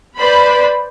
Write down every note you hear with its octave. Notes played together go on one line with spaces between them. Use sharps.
B4 C5 D5 B5